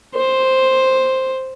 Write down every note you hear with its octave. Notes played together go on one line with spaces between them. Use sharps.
C5